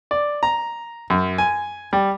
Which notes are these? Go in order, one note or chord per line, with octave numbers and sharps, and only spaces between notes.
D5
A#5
F#2
G#5
G3